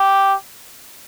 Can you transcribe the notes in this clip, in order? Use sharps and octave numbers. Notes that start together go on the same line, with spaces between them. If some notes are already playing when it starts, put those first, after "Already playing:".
Already playing: G4